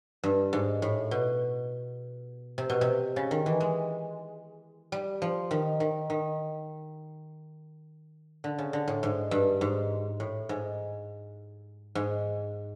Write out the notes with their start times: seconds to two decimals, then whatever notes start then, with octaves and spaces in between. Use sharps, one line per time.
0.24 G2
0.53 G#2
0.82 A2
1.11 B2
2.58 C3
2.70 B2
2.81 C3
3.16 C#3
3.31 D#3
3.46 E3
3.60 G#3
4.92 G3
5.22 F3
5.51 D#3
5.80 D#3
6.10 D#3
8.44 D3
8.58 C#3
8.73 D3
8.88 A2
9.03 G#2
9.31 G2
9.61 G#2
10.20 A2
10.49 G#2
11.95 G#2